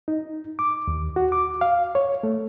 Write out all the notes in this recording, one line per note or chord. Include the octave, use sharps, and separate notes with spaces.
D#4
D6
D#2
F#4
D6
F5
C#5
A3